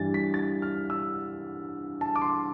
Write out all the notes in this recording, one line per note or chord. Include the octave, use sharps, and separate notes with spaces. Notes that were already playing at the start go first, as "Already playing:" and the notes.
Already playing: G2 E3 G3 A6
B6
A6
F6
E6
A5
D6
C6